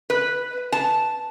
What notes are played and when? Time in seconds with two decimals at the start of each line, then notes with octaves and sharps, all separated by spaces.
0.10 B4
0.72 A5